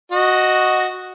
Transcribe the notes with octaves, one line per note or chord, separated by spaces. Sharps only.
F#4 D#5